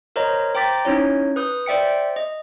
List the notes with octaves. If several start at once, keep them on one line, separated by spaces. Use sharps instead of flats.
A#4 C5 C#5 D#5 A#5
C5 G5 A#5 D6 A6 B6
C#4 D#4 E4 C#5
B4 D#6 G6
C5 D5 E5 G5 C#7
D#5